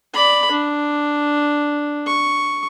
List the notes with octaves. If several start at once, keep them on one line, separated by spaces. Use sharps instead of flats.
D5 B5
D4
C#6